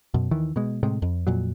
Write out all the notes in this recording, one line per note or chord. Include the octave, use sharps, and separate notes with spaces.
F#2 B2
D#2 D#3 E3
B2 G#3
A2 C3 G#3
F2
F2 A#2 F#3